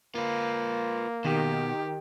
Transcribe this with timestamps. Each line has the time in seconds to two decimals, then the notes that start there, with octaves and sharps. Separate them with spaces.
0.15 A#3 F4 B4
1.25 B2 D#3 G4